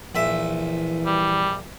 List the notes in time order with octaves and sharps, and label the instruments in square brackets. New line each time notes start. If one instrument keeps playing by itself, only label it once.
[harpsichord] A#1 E5 [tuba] E3
[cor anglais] G3